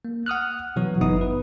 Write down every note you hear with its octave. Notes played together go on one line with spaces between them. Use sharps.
A#3
F#5 D#6 F6 F#6
B2 E3 F#3 B3 F#4
G1 B3 D#4 E4 D#6
B4